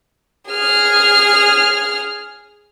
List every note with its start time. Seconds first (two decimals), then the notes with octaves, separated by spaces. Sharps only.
0.50 G#4 F6